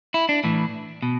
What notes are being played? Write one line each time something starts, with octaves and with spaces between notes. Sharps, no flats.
E4
D4
A2 E3
B2